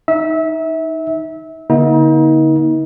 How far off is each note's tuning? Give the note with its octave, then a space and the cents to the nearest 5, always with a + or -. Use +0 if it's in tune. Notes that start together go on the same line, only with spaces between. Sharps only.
D#4 +10 E5 -25
D3 -30 A#3 +45 D#4 +35